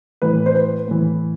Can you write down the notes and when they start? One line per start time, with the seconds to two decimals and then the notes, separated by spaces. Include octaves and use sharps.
0.22 A2 E3 B4
0.46 C5
0.55 B4
0.88 A2 E3